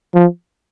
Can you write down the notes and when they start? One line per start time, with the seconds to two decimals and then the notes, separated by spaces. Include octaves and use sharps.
0.14 F3